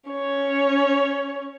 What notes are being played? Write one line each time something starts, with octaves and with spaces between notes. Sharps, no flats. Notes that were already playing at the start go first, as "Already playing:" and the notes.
C#4 C#5